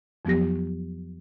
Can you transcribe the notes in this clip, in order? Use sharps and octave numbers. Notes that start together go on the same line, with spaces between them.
F2 F3 F#3 B3 G4 A#6